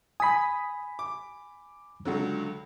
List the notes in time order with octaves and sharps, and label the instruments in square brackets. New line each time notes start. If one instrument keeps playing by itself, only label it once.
[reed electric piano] G#5 B5 [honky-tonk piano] D#6 B6
[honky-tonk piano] D6
C#2 D3 F#3